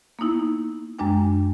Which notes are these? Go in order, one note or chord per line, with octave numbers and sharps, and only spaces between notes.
A#3 B3 D#4 E4
F#2 G#3 D4 G5